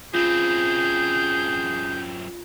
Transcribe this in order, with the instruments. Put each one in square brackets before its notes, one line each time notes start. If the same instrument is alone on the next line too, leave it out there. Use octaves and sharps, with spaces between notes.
[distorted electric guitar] F#2 C4 [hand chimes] F4 [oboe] G#4 [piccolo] G6